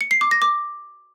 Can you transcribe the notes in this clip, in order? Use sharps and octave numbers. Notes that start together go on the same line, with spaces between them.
C#7
C7
D6
A#6
D6